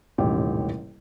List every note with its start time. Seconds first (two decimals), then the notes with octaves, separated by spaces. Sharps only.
0.18 D#1 A1 G#2 C3 C#4 G4